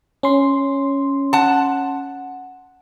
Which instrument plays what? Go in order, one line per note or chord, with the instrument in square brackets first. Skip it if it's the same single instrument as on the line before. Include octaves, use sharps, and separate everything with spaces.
[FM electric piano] C#4 C6
[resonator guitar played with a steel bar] F#5 A5